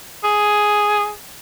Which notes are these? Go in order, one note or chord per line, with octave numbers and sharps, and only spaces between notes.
G#4